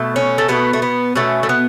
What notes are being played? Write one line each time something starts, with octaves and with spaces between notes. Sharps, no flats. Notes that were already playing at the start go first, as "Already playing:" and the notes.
Already playing: B2 A3
C#4
A3
B2 A3 B3
A3
B3
B2 A3 C#4
A3
B3